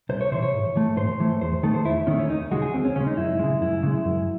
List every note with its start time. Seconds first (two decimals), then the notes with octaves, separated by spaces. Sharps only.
0.09 C2 C5
0.21 C#5
0.31 C3 E3 C5
0.42 C#5
0.54 G#2
0.76 E3 A3
0.97 G#2 C5
1.20 E3 A3
1.41 E2 C5
1.63 D#3 A3 A4
1.74 C5
1.85 E2 E4
2.07 D#3 A3 C#4
2.19 C#4
2.29 D#2 D#4
2.52 C#3 G#3 F#4
2.62 G#4
2.74 D#2 C4
2.85 C#4
2.95 C#3 C#4
3.00 G#3
3.06 D#4
3.17 F#2 E4
3.39 C#3 G#3
3.61 F#2 E4
3.83 C#3 G#3
4.05 F#2